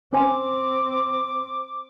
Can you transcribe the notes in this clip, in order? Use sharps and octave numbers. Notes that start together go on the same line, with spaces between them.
C4 C#4 C5 G#5 D6